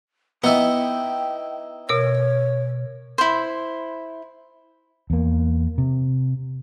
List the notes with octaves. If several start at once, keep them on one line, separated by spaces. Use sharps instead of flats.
B3 D#4 E4 G5
B2 A#4 C#5 E6
E4 C5
E2 A#3
C3